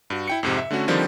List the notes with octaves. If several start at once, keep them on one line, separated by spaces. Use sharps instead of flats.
G2 F#4
E4 G5 C#7
F2 G#2 C3
E5
D3 A3 C#4 F#4
D3 D#3 F3 G3 C4